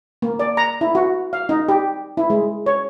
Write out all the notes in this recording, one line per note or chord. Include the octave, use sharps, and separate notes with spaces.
A#3
D5
A#5
E4
F#4
F5
D#4
G4
E4
G#3
C#5